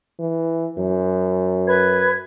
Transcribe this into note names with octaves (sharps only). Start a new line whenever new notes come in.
E3
F#2
B4 G#6